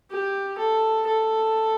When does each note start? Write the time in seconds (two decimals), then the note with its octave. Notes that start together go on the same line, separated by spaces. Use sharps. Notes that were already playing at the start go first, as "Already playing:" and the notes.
0.11 G4
0.58 A4
1.06 A4